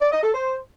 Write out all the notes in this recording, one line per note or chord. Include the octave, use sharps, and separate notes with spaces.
D5
D#5
A4
C5